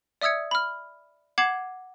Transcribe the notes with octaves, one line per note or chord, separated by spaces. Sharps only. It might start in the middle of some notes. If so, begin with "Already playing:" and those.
D5 E5 D#6 E6 G#6 C#7
B5 F6
F#5 D6 G#6 C7 E7 F#7